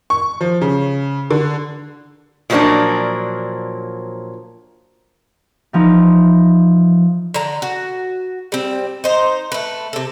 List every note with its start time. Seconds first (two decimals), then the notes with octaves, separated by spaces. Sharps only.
0.10 C#6
0.41 F3
0.62 C#3
1.31 D3
2.50 A#2 F3 F#3 A3 A#3 D4
5.73 E3 F3 D#4
7.34 D3 A#5
7.62 F#4
8.52 G3 C4
9.04 D#4 C5
9.52 A3 B4
9.93 C3 A4